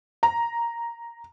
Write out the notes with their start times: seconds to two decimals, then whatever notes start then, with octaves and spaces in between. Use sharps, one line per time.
0.23 A#5